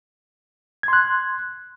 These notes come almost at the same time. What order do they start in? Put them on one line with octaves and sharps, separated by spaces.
G#6 C6 F#6